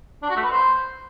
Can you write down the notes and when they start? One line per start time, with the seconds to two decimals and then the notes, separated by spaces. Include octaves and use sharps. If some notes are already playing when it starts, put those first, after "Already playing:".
0.22 D4
0.29 F#4
0.36 A3
0.43 B4
0.50 C5